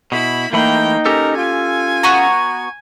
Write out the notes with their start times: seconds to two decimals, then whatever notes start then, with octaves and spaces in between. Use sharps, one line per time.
0.12 B2 E4 B5
0.53 E3 A3 A#3 D#4 G5 B5
1.06 C#4 G4 A4 A#4
1.37 F4 G#5
2.03 B3 F#4 A#5